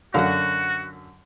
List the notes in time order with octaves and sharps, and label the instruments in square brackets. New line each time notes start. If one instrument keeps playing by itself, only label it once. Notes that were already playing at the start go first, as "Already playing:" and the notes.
[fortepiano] F#2 D3 [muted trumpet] F#4 [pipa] F5 F#5